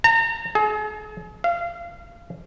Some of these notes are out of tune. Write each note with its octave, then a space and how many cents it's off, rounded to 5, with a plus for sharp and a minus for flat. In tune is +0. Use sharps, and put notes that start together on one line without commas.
A#5 -35
G#4 +40
F5 -25